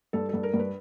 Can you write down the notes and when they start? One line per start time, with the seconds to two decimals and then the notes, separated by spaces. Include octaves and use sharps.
0.13 G2 A4
0.29 G2 A4
0.43 A#4
0.54 G2
0.59 B4